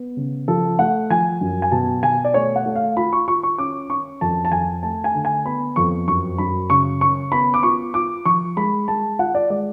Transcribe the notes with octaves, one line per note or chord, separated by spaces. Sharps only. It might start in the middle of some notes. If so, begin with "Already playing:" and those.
Already playing: B3
C#3
F3 A4
A3 F#5
F3 G#5
F#2
G#5
B2 A5
B2 G#5
D5
A3 C#5
F#5
A3
F5
F4 B5
C#6
F4 C#6
C#6
C#4 D6
C#4 C#6
F2 A5
A5
F2 G#5
A3 A5
G#5
D3
G#5
B3 B5
F2 C#6
F#2 C#6
F#2 B5
C#3 C#6
C#4 C#6
B3 B5
D6
F4 C#6
F4 D6
F3 C#6
G#3 B5
G#3 A5
F4 F#5
D5
G#3 D5